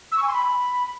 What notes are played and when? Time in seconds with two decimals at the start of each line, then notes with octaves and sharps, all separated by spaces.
0.12 E6
0.17 C#6
0.22 G#5
0.28 C6
0.33 B5